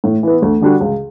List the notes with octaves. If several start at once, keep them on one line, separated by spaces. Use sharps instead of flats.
A2
E3 B3
D2
D3 G3 D4 F#4
C#2